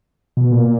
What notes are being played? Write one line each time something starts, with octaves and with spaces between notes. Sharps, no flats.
B2
A#2